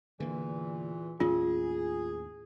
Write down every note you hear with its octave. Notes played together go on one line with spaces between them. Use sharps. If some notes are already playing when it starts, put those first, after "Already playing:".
E2 A#2 D3 E3 A#3
D#2 A2 C#4 F4 G#4